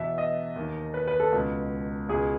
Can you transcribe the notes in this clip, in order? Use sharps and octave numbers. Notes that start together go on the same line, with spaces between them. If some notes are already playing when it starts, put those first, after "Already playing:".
Already playing: E2 B2 E5
D#5
D#2 D#3
B4
B4
A4
C#2 B2
C#2 B2 G#4